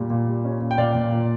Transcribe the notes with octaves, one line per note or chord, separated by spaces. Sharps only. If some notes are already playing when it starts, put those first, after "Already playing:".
Already playing: A#2 G3
A#2
G3
C#4
A#2
G5
A#2 D5 F5
A#2
A#2